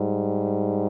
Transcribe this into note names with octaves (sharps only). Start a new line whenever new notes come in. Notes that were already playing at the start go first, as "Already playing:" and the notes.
Already playing: G#2 G3